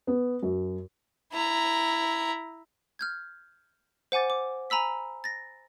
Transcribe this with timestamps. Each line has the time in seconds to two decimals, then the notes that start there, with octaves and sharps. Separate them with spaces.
0.07 B3
0.43 F#2
1.33 E4 A#5
2.99 F6 G6 G#6
4.12 C5 F#5 G#5 D6 A6
4.30 D6
4.70 G#5 A#5 B5 E6 B6
5.24 A6 A#6